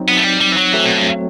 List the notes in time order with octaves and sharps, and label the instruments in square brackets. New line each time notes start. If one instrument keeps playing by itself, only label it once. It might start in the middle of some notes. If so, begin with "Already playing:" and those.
Already playing: [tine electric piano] F#3 C4 D#4
[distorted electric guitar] B3
A3
G3
G3
E3
F#3
[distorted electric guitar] E3 [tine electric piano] F#3 A3 C4
[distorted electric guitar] B2
G2